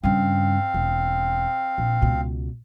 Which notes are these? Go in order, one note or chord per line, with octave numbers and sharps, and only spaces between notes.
G2 C#3 C4 F5
E1
A#1
C#2 B2